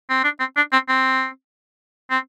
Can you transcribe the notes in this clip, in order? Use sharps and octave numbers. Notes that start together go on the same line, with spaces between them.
C4
D4
C4
D4
C4
C4
C4